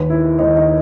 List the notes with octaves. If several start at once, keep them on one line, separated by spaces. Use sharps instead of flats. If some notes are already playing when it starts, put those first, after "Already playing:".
Already playing: D#2 D#3 B4
E4
D#2 D#3 D#4
D#4